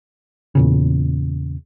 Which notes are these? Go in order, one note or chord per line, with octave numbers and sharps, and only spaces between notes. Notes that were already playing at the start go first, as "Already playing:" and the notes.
E2 A#2 C#3